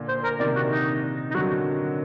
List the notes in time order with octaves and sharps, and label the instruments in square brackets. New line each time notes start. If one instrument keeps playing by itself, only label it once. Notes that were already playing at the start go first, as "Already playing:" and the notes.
Already playing: [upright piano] A#2 D3
[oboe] C5
A#4
[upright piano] C3 D#3 [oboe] D5
[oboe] F#4
D#4
D#4
[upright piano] D3 F#3 [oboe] F#4